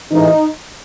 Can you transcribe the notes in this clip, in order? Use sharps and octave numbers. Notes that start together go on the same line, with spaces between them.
A1 G#2 E3 D#4